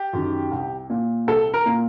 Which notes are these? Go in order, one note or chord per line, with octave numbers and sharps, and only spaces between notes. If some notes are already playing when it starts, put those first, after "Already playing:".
Already playing: G4
F#2 D#3
C2
A#2
C2 A4
A#4
A#2